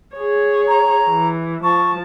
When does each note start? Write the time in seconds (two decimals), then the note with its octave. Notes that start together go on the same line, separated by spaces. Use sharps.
0.16 G#4 C#5
0.68 A#5
1.09 E3
1.63 F3 A5 C#6